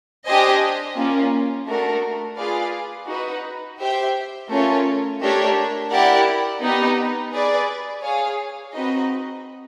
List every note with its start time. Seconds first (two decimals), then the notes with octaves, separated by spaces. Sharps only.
0.26 D4 G4 C5 D#5 G#5
0.96 A#3 C#4 F4
1.67 A3 D4 F#4 A#4
2.37 F4 G#4 B4 D5 F5
3.08 D#4 F#4 B4
3.79 G4 C5 E5 G5
4.50 A3 C#4 F4 A#4 C#5
5.20 A3 D4 G4 A#4 C#5
5.90 E4 G4 A#4 D5 F#5
6.61 B3 D#4 G4 B4
7.32 G#4 B4 D5
8.03 G#4 C#5 F5 G#5
8.74 C4 D#4 F#4 B4 D#5